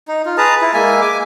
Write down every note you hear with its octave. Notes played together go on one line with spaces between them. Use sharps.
D#4
F4
G#4 B4 A5 A#5
E4
G#3 A#3 E5 G#5
G#5 D6